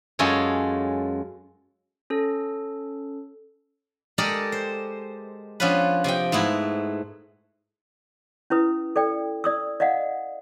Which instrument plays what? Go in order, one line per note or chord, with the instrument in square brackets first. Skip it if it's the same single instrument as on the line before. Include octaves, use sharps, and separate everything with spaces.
[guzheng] F#2 G#3 F4 G#4 A4 C#5
[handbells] C#4 A4
[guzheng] G#3 G4 A4 A#4 D5 D#5
C5
F3 B3 C#4 D4 F4 B4
C3 F3 D#5 G5
G#2 A3 B3 E4
[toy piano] C#4 E4 B4 D#6
A4 D5 G5
D5 D#6 E6
D5 D#5 F5 F#5